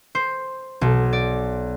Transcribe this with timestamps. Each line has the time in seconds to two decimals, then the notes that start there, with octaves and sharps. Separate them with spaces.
0.15 C5
0.81 B1
1.13 D5